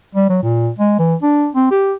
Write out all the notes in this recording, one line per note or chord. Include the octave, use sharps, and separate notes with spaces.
G3
F#3
A#2
G#3
E3
D4
C4
G4